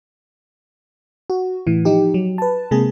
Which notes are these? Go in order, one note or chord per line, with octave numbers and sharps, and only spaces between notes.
F#4
A2 E3
F3 D#4 G4
F#3
B4 A5
C3 G#3 A#3 G#4